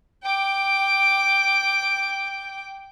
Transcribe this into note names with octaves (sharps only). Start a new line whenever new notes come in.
G5 D6